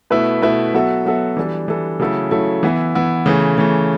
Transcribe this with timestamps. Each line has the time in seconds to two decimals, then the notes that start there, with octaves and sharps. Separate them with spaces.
0.10 B2 A3 E4 B4 E5
0.42 B2 A3 E4 B4 E5
0.74 F#3 B3 F#4 A4 E5
1.06 F#3 B3 F#4 A4 E5
1.37 E3 G3 D4 A4
1.68 E3 G3 D4 A4
2.00 C#3 F#3 A3 E4 A4
2.31 C#3 F#3 A3 E4 A4
2.63 E3 B3 E4
2.95 E3 B3 E4
3.26 C#3 E3 A3
3.58 C#3 E3 A3